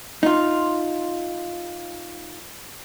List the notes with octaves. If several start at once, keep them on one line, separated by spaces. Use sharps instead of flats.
D#4 F4